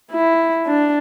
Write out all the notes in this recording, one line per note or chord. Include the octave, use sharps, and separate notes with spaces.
E4
D4